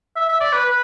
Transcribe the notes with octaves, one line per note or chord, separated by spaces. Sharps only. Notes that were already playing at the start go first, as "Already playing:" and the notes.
E5
E5
D5
B4
B4